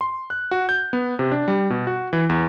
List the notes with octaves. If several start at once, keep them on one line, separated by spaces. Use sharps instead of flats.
C6
F#6
F#4
G6
B3
C3
D4
G3
B2
F#4
E3
E2